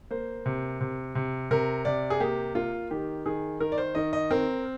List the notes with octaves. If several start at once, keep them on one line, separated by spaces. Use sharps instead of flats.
A#3 C5
C3
C3
C3
C3 A#4
C3 D5
G#4
A#3 G4
A#3 F4
D#3 G4
D#3 G#4
D#3 A#4
D5
C5
D#3 D#5
D#5
C4 A#4